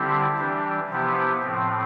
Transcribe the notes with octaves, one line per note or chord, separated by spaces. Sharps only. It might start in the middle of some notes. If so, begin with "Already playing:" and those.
Already playing: D3 G3 C4 E4 G4
E3 G3 D4 G4
C3 F3 B3 E4 G4
A2 F3 C4